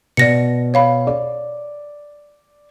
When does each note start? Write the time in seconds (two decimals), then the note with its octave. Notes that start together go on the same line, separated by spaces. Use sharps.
0.17 B2 D5 A#6 C#7
0.74 C#5 F5 B5
1.07 D5